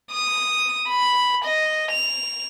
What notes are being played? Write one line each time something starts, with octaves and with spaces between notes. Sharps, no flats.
D#6
B5
D#5
F7